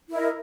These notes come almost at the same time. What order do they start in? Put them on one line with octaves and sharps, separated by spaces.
E4 A#4 D#5